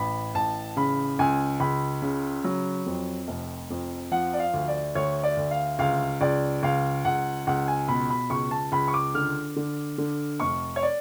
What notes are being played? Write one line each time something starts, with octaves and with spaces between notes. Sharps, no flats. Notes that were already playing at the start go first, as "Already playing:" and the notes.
Already playing: A1 B5
A1 A5
C#3 B5
C#2 G#5
C#2 B5
C#3
F#3
F2
F1
F2
F3 F#5
D5
F5
D2
D5
D2 C#5
D5
D2
F5
C#2 F5
C#2 D5
C#2 F5
C#2 F#5
C#2 F#5
G#5
B2 B5
B5
C#2 C#6
A5
C#2 B5
C#6
D6
D3 F6
D3
D3
F1 C#6
C#5
D5